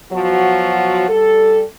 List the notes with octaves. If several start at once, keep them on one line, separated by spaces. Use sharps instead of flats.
B2 F3 F#3 F#4
G3 A4